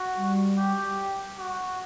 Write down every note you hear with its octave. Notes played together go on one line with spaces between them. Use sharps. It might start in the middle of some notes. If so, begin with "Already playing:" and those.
Already playing: F#4
G3
G4
F#4